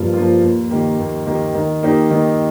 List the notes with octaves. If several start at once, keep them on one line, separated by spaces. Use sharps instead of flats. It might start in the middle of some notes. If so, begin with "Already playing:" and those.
Already playing: G2 F3 A#3 F4
F3 A#3 F4
D#2
D#3 A#3 G4
D#2
D#3 A#3 G4
D#3
A#3 D#4 G4
D#3